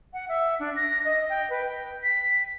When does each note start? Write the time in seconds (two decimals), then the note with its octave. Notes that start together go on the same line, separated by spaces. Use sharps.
0.13 F#5
0.29 E5
0.60 D4
0.76 A#6
1.05 D#5
1.29 G5
1.50 B4
1.66 G5
2.04 B6